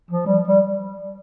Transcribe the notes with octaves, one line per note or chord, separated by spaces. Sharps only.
F3
G3
G3